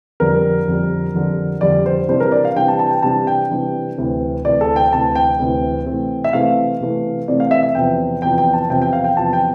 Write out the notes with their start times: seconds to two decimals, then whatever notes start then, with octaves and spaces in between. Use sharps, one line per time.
0.20 F2 D3 G3 A#4
0.68 F2 D3 G3
1.14 F2 D3 G3
1.61 F2 D3 G3 D5
1.86 C5
2.08 C3 E3 G3 D4 C5
2.20 A#4
2.32 D5
2.45 F5
2.56 C3 E3 G3 D4 G5
2.68 A5
2.79 A5
2.91 G5
3.03 C3 E3 G3 D4 A5
3.27 G5
3.50 C3 E3 G3 D4
3.98 D2 C3 E3
4.45 D2 C3 E3 D5
4.61 A4
4.76 G5
4.92 D2 C3 E3 A5
5.15 G5
5.39 D2 C3 E3
5.86 C3 E3 A3 C4
6.24 E5
6.33 C3 E3 A3 C4 F5
6.80 C3 E3 A3 C4
7.28 C3 E3 A3 C4 D5
7.40 F5
7.51 E5
7.63 E5
7.75 E2 C3 F3 G5
8.22 E2 C3 F3 G5
8.38 G5
8.54 A5
8.70 E2 C3 F3 G5
8.82 G5
8.93 F5
9.04 G5
9.17 E2 C3 F3 A5
9.33 G5